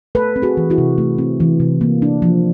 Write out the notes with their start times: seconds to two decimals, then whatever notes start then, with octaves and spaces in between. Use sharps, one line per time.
0.15 A3 A4 B4
0.36 C4
0.42 F#4 G#4
0.57 E3
0.70 E4 F#4
0.78 C3
0.98 A3
1.18 C4
1.40 E3
1.60 C3
1.81 A#3
2.02 D4
2.22 F3